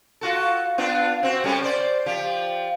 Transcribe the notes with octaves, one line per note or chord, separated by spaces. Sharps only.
F4 F#4 A4
B3 D4 F4
C4 F#4
G3 C#4 A4
C5 D5
F3 G4